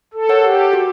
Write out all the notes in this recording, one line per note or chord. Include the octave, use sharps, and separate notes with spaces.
A4
A#4 C#5 F#5
G4
F#4